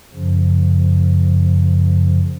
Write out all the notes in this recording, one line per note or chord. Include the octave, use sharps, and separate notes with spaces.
F#2 C#3 F3